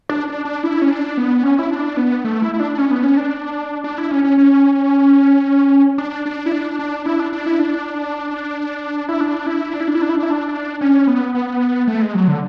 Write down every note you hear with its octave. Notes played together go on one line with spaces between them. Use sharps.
D4
D4
D4
E4
C#4
D4
B3
C#4
E4
D4
B3
A3
E4
E4
D4
C#4
B3
C#4
D4
D4
E4
C#4
C#4
C#4
D4
D4
E4
D4
D4
E4
D4
D4
E4
D4
E4
D4
E4
D4
E4
D4
E4
D4
E4
D4
E4
D4
C#4
B3
B3
A3
G#3
F#3
D3